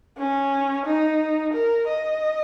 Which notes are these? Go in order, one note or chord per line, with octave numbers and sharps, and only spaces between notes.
C#4
D#4
A#4
D#5